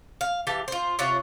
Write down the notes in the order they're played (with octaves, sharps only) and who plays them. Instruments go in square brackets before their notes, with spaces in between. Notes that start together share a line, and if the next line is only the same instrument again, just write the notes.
[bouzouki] F5
E3 G4 F5 A5
F4 C5
C3 F4 C#5 F#5